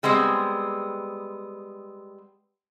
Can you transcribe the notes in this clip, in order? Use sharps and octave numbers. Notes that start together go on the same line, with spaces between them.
G3 G#3 B3 C4